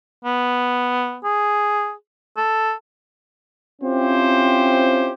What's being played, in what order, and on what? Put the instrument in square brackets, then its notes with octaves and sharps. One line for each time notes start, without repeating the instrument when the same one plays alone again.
[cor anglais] B3
G#4
A4
[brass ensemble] C4 C#4 E4 F4 G4 C5